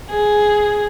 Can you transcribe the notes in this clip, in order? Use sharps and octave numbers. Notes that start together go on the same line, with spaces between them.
G#4